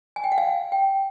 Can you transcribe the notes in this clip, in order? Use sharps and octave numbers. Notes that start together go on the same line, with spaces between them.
G#5
G5
F#5
F5
G5